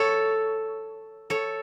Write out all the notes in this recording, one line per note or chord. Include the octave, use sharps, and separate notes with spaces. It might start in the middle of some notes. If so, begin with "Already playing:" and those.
Already playing: A4 C#5
A4 C#5